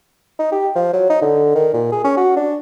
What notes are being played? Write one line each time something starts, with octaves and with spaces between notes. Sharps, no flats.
D#4
G4
F3
F#3
D#4
D3
D#3
A#2
G#4
C#4
F#4
D4